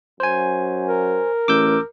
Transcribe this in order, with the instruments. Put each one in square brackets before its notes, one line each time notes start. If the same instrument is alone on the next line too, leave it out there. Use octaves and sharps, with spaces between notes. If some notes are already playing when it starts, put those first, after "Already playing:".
[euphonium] F#2 [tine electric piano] C5 G#5
[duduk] A#4
[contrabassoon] A1 [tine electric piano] D6 E6 G6